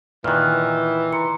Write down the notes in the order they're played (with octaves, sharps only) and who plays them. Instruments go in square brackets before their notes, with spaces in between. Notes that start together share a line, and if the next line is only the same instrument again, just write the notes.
[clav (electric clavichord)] A#2 D#3 [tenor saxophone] E3 [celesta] F6 F#6
[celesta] A#5 C6 C#7